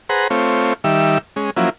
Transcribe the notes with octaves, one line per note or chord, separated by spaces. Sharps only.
G#4 B4 C5 F#5 A#5
A3 C4 F4 C#5
D#3 G3 E5
G#3 C#4
F3 F#3 A#3 C#4 E4